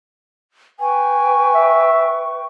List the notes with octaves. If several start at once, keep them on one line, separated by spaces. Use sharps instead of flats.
B4 G5 G#5 C#6
E5